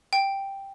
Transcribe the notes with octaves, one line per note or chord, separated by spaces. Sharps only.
G5